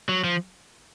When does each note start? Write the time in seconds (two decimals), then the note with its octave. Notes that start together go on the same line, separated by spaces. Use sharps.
0.09 F#3
0.24 F3